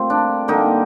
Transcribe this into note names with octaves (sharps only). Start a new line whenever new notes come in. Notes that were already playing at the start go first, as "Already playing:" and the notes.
Already playing: A2 G3 A#3 C4 F4
D4
D3 G3 A#3 D#4